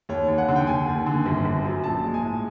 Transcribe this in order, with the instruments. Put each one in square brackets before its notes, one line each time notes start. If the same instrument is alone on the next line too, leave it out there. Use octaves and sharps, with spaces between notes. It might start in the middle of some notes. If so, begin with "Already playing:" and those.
[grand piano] D#2 C#5
D#2
F#5
D3
G5
D#2 G#5
D#2
D3
G1
G1
F#2
A#1 A5
G#3
G#5
A2